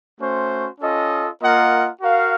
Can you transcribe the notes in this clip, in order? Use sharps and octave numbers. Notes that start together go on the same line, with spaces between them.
A3 C#4 F#4 C5
C#4 F4 A4 D#5
A#3 F4 A#4 D#5 F#5
F#4 A#4 F5